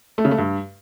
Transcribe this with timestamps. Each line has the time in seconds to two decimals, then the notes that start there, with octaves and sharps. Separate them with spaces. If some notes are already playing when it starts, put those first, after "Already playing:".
0.18 A3
0.25 C#3
0.31 A3
0.38 G2